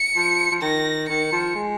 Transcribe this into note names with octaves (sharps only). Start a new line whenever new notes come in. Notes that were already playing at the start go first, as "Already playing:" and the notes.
Already playing: C#7
F3
F3
D#3 A#6
D#3 C#7
F3
G#3